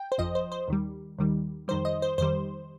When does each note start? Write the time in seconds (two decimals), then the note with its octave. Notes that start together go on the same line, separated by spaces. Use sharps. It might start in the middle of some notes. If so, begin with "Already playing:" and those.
Already playing: G5
0.12 C5
0.18 G1 F2 F3 D#5
0.35 C5
0.52 C5
0.68 D#2 D#3 G3
1.19 D#2 D#3 G3
1.68 F2 D#3 G3 C5
1.85 D#5
2.02 C5
2.18 F2 D#3 G3 C5